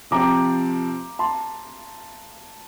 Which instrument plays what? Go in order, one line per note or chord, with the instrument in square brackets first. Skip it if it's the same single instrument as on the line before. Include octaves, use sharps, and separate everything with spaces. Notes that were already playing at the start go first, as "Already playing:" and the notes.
[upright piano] C3 F3 C4 G4 [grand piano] A#5 D6
[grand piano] A5 C6